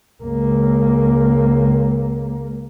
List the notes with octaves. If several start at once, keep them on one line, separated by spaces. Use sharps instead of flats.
C#2 A#3